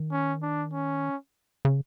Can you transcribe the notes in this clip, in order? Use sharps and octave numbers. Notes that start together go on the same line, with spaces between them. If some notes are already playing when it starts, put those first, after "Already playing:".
Already playing: D#3
C#4
D4
C#4
C#3